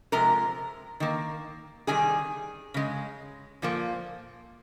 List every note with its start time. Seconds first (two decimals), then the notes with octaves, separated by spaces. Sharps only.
0.12 C3 F3 G#3 A#4 A#5
1.00 D#3 A#3
1.87 C3 D#3 G3 G#4 G#5
2.74 C#3 G#3
3.62 A#2 F3 A#3